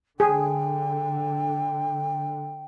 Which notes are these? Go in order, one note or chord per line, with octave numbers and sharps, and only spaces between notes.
D3 G#4 G5